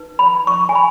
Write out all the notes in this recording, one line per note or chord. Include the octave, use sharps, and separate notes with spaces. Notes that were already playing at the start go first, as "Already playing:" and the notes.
Already playing: D#4 B4
B5
C#6
G#5
B5